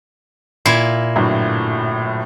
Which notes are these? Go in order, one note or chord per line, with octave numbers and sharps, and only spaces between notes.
A#2 E4 G#6 C7
G1 A2 F#3